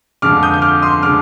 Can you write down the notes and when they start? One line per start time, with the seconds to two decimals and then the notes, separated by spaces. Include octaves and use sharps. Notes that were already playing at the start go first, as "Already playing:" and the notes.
0.22 F2 D3 G#3 D6 F6
0.43 D#6 G6
0.54 G6
0.62 D6 F6
0.82 C6 D#6
1.02 D3 G#3 D6 F6